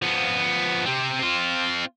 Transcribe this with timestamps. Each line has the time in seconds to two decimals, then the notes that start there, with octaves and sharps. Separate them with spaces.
0.02 F3 B3
0.86 C3 C4
1.20 C4 F4